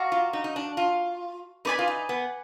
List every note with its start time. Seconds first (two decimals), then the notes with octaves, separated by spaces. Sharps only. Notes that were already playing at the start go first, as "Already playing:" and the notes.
Already playing: F#4 D5 F5 A#5
0.12 F4
0.33 D#4
0.44 D#4
0.56 D4
0.77 F4
1.65 D#4 B4 D5 G#5 B5
1.79 F4
1.87 D#4
2.09 B3